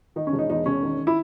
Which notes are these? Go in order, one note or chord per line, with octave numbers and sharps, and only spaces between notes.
D#3 D#4
C#4
E1
D#4
E2 D#4
E1 C#4
D#3
E4